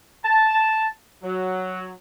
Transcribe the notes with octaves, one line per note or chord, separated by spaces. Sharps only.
A5
F#3